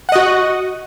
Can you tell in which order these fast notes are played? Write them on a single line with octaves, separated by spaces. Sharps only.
F#5 D#5 F#4